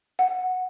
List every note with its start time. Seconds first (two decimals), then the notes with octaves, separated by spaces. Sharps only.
0.19 F#5